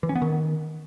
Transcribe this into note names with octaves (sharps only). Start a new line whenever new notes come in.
E3
C#4
B3
D#3